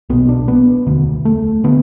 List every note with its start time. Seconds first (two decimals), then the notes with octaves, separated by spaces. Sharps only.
0.09 B1 B2 B3
0.29 D4
0.48 B3
0.87 E1 D2 D3
1.25 A3
1.64 D3 B3